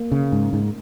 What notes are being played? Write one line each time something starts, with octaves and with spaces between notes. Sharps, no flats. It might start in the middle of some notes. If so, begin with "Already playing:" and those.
Already playing: A#3
C#3
G#2
G#2